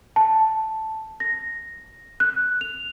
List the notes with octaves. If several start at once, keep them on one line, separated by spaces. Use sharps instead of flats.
A5
A#6
F#6
F7